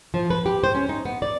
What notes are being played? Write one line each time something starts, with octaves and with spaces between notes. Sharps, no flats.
F3
B4
G4
C5
C#4
D#4
B3
D5